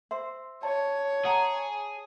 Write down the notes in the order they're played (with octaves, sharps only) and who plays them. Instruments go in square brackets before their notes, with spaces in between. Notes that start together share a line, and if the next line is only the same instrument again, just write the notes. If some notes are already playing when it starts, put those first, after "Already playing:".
[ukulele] C5 [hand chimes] E5 C6
[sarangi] C#5 [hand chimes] A5
[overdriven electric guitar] G#4 [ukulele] F#5 A#5